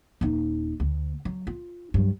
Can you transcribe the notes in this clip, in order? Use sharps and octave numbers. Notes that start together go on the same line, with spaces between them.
D#1 D#4
D2
F#3
F4
G2 F#3